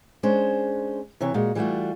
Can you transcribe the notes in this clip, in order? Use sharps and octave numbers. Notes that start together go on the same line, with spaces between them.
G#3 C#4 D4 C5
C3 E3 C#5
A#2 G#3 F#4
E3 G3 A3 D#4 F4 F#4